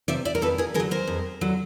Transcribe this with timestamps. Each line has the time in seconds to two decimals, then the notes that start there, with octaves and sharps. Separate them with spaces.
0.08 C3 F3 D5 E5
0.25 D5 E5
0.35 A#4
0.42 F2 A4 B4
0.58 G#4 A#4
0.74 D3 G#4 A#4
0.80 F#3
0.91 A#4 C5
1.07 F2
1.41 D3 F#3